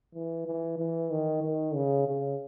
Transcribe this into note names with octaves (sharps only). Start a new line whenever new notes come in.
E3
E3
E3
D#3
D#3
C#3
C#3